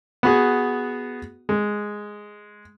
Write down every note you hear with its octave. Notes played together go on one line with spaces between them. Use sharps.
B3 F#4 G#4
G#3